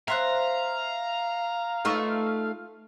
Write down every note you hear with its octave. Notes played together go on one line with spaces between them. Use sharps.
C4 E5 F5 A#5 C6 F#6
A3 D#4 F4 B4 C#6 E6